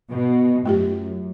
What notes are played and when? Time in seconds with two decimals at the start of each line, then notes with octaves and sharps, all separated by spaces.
0.10 B2
0.66 F#2 A3 F4 G4